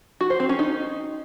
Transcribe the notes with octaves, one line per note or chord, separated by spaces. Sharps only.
F#4
C5
C4
C#4
D#4